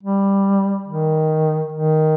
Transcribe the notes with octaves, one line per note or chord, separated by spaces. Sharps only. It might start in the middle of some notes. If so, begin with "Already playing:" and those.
G3
D#3
D#3